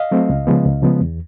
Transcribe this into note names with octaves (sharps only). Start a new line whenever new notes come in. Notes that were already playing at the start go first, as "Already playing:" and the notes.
Already playing: D#5 F5
F#3 A3 C4
C#2
C#3 F3 G#3 B3
C#2
C#3 F3 G#3 B3
E2